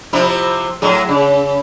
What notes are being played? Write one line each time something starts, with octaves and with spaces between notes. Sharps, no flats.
C3 F3 E4
A2 F#3 G#4
C#3